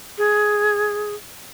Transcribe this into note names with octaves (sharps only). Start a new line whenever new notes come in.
G#4